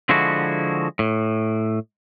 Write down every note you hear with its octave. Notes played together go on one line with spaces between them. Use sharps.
D3 F3 G#3 E4 F#4
A2